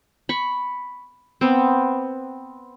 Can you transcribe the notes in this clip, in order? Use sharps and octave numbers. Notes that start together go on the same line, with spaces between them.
B5 C#6
B3 C4